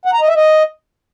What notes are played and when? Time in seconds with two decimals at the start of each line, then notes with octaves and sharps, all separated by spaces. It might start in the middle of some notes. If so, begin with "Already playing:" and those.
0.06 F#5
0.13 A#5
0.21 D#5
0.28 E5
0.36 D#5